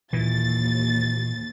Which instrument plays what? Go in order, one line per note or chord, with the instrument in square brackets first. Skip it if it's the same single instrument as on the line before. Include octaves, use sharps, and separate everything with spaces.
[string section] D#2 A6 [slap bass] A#2 E3